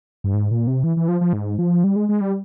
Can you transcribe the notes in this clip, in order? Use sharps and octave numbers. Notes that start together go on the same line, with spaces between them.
G2
G#2
A#2
C3
E3
E3
F3
F3
G#2
F3
G3
G#3
G#3
G3